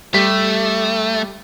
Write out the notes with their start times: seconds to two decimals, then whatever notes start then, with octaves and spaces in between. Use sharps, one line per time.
0.14 G3 A3 G4 B6